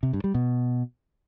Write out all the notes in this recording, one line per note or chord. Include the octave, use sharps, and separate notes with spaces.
C3
G2
G3
B2